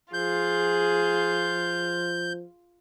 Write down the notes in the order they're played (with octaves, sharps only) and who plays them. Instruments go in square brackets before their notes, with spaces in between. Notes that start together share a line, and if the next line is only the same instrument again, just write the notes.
[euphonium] F3 [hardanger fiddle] F4 [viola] G#4 [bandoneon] G6